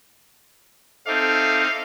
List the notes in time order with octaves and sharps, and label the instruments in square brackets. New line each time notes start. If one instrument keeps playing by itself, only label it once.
[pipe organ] C4 D#4 [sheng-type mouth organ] A4 E5 D6 [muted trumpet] F5